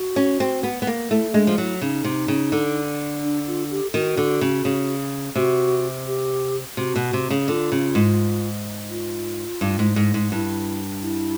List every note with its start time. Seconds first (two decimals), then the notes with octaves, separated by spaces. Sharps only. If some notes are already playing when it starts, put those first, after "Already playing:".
Already playing: F#4
0.16 C#4
0.40 C4
0.63 B3
0.82 B3
0.87 A#3
1.10 A3 E4
1.34 G#3 D4
1.47 F3
1.58 F#3 E4
1.81 C#3 D#4
2.04 C3
2.28 C#3
2.52 D3
3.23 D4
3.47 F4
3.71 G4
3.94 D#3 F#4
4.17 D3
4.41 C#3
4.65 C#3
5.35 C3 F#4
6.07 G4
6.77 C3 F#4
6.96 B2
7.13 C3
7.30 C#3
7.48 D3 F4
7.72 C#3
7.95 G#2
8.90 F4
9.61 G2
9.79 G#2
9.96 G#2
10.14 G#2
10.32 G2 E4
11.02 E4